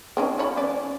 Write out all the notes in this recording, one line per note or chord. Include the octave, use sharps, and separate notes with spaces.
C4 C#4 D#4
F3 C#5 B5
C#4 B4 D5